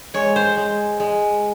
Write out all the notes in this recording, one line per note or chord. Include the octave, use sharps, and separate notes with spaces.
G#3 C#5
C5
G#3
G#3